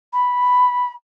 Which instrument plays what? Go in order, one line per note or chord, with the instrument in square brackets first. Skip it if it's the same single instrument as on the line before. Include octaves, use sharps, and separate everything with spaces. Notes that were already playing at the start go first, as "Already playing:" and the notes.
[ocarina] B5